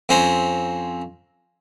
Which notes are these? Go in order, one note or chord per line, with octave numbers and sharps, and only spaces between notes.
F2 C4 C#4 A#5